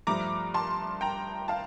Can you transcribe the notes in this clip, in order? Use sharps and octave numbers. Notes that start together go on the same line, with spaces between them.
G2 F3 A3 A#5 D6
A5 C6
G5 A#5
F5 A5